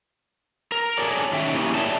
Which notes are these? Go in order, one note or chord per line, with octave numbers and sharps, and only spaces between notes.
A#4
G#4 A4 C#5 D5
D#3 C#4 E5 G5
A#3 C#4 E4 G4 G#4
G#4 C#5 D5 E5 G5 A5